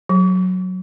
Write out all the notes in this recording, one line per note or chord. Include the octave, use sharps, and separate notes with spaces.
F#3